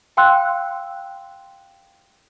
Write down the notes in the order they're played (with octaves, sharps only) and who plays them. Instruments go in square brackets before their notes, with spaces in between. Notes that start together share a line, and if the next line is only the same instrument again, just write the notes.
[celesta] F5 G5 C6 E6 F#6